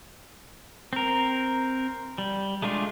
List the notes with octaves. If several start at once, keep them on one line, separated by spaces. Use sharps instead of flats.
C4 A#4
G3
G#3 A3 D4 F4